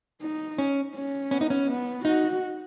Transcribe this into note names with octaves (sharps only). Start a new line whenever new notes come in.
D#4
C#4
C#4
B3 C#4
D#4
C#4
B3
D#4 F#4